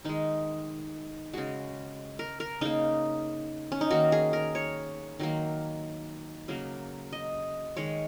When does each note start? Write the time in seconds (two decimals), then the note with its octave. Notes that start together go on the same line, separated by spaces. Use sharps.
0.05 D#3 G#3 D#4
1.33 C#3 G#3 F#4
2.19 A#4
2.40 A#4
2.61 C#3 A#3 D#4
3.72 C#4
3.81 D#4
3.91 D#3 A#3 F#4
4.12 G#4
4.33 A#4
4.55 C#5
5.20 D#3 F#3 A#3
6.48 C#3 F#3 A#3
7.13 D#5
7.77 D#3 G#3 C#5